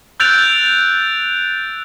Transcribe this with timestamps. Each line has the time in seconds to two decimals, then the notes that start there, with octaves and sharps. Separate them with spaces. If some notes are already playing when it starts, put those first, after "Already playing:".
0.20 E6 F#6 G6 A6 D7 F7